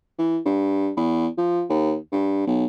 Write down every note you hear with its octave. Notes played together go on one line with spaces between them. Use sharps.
E3
G2
E2
F3
D#2
G2
B1